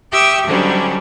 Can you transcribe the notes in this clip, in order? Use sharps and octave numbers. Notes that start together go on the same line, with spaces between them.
G4 E5 G5 C#6 D#6 E6
G#2 D3 F#3 G3 C#4 D4